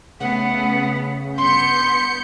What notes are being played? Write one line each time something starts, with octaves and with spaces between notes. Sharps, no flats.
C#3 A3 B3 F#5
G2 B3 C6 G6 C#7